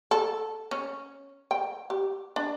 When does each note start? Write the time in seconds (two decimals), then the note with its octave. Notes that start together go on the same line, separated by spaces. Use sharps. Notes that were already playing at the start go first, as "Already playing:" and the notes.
0.11 A4
0.71 C#4
1.51 G5
1.90 G4
2.36 D4